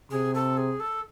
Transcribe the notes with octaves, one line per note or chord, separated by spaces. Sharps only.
C3 G#4
A4
G#4
A4